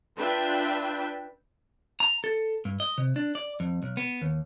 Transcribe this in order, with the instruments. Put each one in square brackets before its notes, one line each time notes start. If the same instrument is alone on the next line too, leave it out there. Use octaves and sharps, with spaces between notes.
[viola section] D4 F4 B4 E5 G5
[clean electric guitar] A#5
A4
G2
D#5
C3
D4
D5
F2
B1
B3
D#2